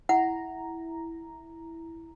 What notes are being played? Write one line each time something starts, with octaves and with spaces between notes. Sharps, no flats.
E4 F#5 A#5